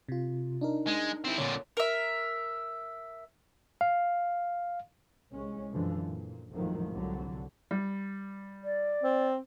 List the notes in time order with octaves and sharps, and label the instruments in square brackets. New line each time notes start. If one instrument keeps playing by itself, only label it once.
[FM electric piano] C3 F4
D4 D#4 A#4
[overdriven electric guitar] G#3
C4 E4
[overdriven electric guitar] A#2 D3 [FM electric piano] C#5
[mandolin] A#4 E5
[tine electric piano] F5
[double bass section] C2 G#3 C#4
F#2 B2 D3 E3 F3
A#2
G#1 F2 A2 D#3 F3 F#3
C2 D3 F#3
[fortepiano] G3
[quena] D5
[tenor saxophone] C4